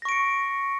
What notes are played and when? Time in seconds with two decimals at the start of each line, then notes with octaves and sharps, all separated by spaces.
0.02 A#6
0.05 C#6
0.09 D7
0.12 C#7